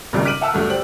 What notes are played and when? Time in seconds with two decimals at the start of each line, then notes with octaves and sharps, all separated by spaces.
0.13 G#1 G2 A#2 C#3 G3
0.25 D6 F6 B6 D7 D#7 F#7
0.41 E5 F#5 A5 E6 F6
0.53 D2 G2 A3
0.70 G4 C5 D5 F#7